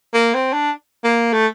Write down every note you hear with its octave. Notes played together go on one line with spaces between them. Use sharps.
A#3
C4
D4
A#3
A3